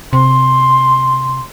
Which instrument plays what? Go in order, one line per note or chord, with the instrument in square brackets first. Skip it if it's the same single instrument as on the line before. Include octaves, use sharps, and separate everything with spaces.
[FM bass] C3 [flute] C6